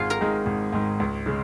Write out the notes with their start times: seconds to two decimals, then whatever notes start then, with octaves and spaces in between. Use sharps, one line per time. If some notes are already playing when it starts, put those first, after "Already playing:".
Already playing: G#1 F4 G#4 F5 G#5
0.10 A#4 A#5
0.20 G#2 D#3 G#3
0.46 G#1
0.73 G#2 D#3 G#3
1.00 C#2
1.26 C#3 G#3